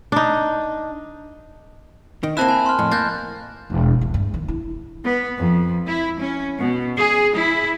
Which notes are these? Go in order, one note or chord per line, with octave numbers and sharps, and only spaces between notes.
D4 D#4
D#3
A#3 C4 E4 A5 F#6 E7
G#5 B5
C6 F6
F2 A2
A#3 F#6 G6 A6
E1
C2
G2
D#3
E4
B3
F2
E4
C#4
B2
G#4
E4